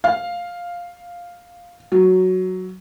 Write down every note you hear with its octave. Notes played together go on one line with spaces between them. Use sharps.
F5
F#3